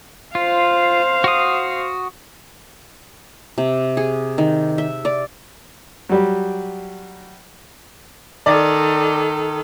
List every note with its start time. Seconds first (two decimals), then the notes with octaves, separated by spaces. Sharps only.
0.35 F4 C5 F5
1.24 F#4 D#6
3.58 C3
3.97 G#4
4.38 D#3
4.78 E5
5.05 D5
6.09 F#3 G3 G4
8.46 D#3 A4 D5